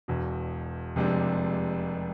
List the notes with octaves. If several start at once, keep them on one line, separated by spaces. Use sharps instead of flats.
E1 E2 B2
F1 F2 C3 G#3 D4